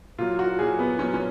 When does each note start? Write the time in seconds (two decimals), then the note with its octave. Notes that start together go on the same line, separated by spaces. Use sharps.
0.18 A#2 F#3 F4
0.39 F#4
0.59 A#2 F#3 G#4
0.79 B3
0.99 A#2 F#3 C#4
1.14 C#4